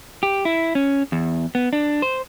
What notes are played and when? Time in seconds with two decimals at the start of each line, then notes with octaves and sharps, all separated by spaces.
0.23 G4
0.45 E4
0.75 C#4
1.12 E2
1.55 B3
1.73 D4
2.02 C5